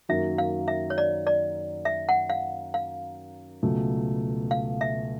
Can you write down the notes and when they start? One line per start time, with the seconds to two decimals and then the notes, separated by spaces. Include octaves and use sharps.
0.09 F#2 D#3 F#3 A#3 E5
0.38 F5
0.68 E5
0.90 C#5
0.98 D5
1.27 D5
1.85 E5
2.09 F#5
2.30 F5
2.74 F5
3.63 C#2 B2 F#3 A3
4.51 F5
4.81 E5